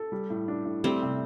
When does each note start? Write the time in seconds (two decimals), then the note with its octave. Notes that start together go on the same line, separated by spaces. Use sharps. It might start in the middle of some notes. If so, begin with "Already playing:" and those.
Already playing: A4
0.12 G3
0.30 A2
0.48 D4
0.65 A2
0.84 G3 A3 C4
1.02 C3